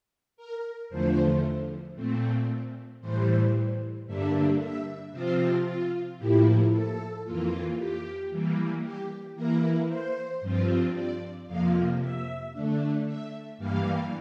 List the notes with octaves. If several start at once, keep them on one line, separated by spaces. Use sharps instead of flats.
A#4
E2 D3 F3 A3 C5
A#2 A3 C4
A2 E3 G3 C5
G2 D3 G3 A#3 D4 E5
E5
C3 F3 C4 F4 C5
F4
A2 F3 A#3 E4 G4
A4
F2 E3 A#3 F4
G4
E3 G3 A#3
G4
E3 A#3 E4 A#4
C5
G2 F3 C4 F4
D5
F2 C3 F3 A#3 F5
E5
D3 A3 D4
E5
G2 E3 G3 A#3 F5